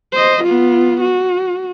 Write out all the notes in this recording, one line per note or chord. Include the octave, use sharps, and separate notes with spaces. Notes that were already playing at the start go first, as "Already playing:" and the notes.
C5 D#5
B3 F4
F#4